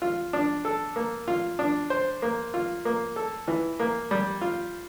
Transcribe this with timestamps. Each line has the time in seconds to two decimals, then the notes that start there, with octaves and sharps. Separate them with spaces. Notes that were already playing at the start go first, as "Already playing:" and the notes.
0.02 F4
0.33 D4
0.65 A4
0.96 A#3
1.28 F4
1.59 D4
1.90 C5
2.22 A#3
2.54 F4
2.85 A#3
3.16 A4
3.48 E3
3.80 A#3
4.11 G3
4.41 F4